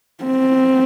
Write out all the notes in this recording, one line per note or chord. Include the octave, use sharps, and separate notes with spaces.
C4